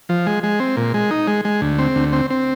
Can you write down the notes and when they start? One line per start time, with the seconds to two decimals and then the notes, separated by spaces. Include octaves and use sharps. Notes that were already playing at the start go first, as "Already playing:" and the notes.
0.09 F3
0.26 G#3
0.43 G#3
0.60 C4
0.77 A#2
0.94 G#3
1.11 D#4
1.27 G#3
1.45 G#3
1.62 D2
1.79 C4
1.95 D2
2.13 C4
2.30 C4